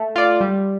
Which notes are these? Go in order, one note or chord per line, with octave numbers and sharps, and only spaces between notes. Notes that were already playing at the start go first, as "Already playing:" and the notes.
Already playing: A3
F4 D5
G3